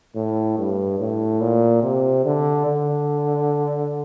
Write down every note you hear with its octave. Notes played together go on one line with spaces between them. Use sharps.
A2
G2
A2
A#2
C3
D3
D3